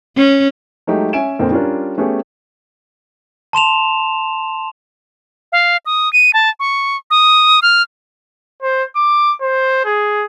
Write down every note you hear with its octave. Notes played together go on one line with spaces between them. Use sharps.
C#4
F#3 G#3 A3 D#4 G4
C#4 E5 G#5 D7 E7
F2 A#2 D3 C4
G3 C#4 D4 F4 A#4
A3 B3 C#4 G4 G#4
A5 C6 E7 F7
F5
D#6
D#7
A5
C#6
D#6
F6
C5
D6
C5
G#4